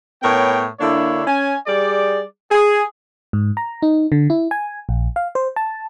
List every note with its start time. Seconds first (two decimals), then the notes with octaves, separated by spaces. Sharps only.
0.23 A2 B3 A#4 C#5 G5
0.80 D3 A#3 D4 E4 C#5
1.27 C#4 G#5
1.67 G3 G#4 D5
2.52 G#4
3.33 G#2
3.57 A#5
3.82 D#4
4.12 D3
4.30 E4
4.51 G#5
4.89 A#1
5.16 F5
5.35 C5
5.56 A5